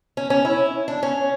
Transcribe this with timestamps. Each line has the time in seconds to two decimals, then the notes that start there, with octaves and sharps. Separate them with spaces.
0.17 C#4
0.30 C#4
0.45 E4
0.88 D4
1.03 C#4